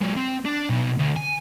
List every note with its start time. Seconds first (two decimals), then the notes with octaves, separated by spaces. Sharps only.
0.02 F#3 G#3
0.17 C4
0.45 D4
0.70 B2 D#4
0.99 D2
1.17 G#5